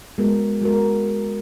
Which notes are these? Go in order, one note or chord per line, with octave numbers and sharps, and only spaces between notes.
G#3 B3 F#4 A#4
G#3 B3 F#4 A#4